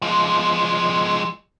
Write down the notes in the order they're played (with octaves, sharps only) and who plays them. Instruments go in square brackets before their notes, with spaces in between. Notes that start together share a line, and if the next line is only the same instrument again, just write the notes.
[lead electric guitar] F3 G#3